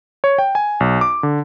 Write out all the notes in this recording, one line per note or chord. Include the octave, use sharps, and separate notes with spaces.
C#5
G5
G#5
B1
D6
D3